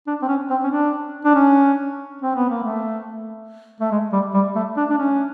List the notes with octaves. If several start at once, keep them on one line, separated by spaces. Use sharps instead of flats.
D4
C4
C#4
C4
C#4
D4
D4
C#4
C4
B3
A#3
A3
A3
G#3
G3
G3
A3
D4
D4
C#4